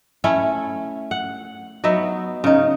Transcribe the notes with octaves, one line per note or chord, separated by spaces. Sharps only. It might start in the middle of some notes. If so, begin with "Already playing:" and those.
A3 C#4 E4 C#5
F#5
F#3 B3 D#4 E5
C#3 D#4